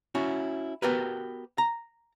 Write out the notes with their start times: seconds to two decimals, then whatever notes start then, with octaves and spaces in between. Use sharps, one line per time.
0.15 C#4 E4 F#4
0.82 B3 F#4 G4 A#4 B4
1.58 A#5